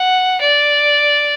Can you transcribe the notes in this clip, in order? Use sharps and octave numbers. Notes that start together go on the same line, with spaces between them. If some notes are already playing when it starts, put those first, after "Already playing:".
Already playing: F#5
D5